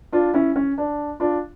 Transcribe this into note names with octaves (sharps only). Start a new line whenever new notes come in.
D4 F4
C#4 E4
C#4
D4
D4 F4